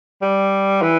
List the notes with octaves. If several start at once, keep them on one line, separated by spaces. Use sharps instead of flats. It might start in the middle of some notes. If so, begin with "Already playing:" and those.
G3
E3